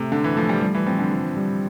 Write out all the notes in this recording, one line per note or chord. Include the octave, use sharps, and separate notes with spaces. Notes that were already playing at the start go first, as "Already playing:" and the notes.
Already playing: C3 A3
D3 A4
E3
F3 A3
G3
F3 G3
E3
F3 C4
D3
F4
G3